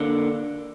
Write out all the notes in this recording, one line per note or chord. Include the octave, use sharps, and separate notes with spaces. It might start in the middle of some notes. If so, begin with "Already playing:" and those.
Already playing: D3 A#3